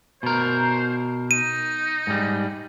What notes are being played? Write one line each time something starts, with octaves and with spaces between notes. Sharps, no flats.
B2 A#4 C5
D#4 D#7
G#2 G3